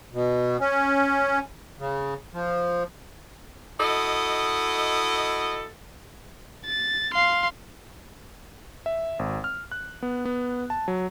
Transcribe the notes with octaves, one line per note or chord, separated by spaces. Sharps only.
B2
C#4
C#3
F3
E4 F#4 A4 D#5
A6
F5 C6
E5
G#1
F6
F#6
B3
B3
A5
F#3